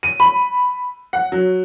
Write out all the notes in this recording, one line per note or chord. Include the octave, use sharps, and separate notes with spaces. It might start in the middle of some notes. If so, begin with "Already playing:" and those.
D#7
B5
F#5
F#3